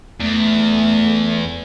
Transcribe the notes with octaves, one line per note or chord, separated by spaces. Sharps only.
E2 A3